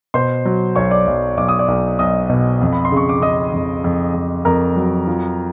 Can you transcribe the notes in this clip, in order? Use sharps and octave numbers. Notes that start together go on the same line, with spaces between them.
B2 C5 C6
F#3
B1 C#5 C#6
D5 D6
B1
B1 D6
D#6
D5 D6
B1
B1 D#5 D#6
B2
F2
B5
C6
C#3
C#6
D6
C#3 D#5 D#6
F2
F2
F2
F2 A#4 A#5
F#3
F3